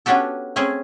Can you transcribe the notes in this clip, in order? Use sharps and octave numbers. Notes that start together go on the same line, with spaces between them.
B3 C#4 D4 F#4 G4 A4
A3 C4 C#4 G#4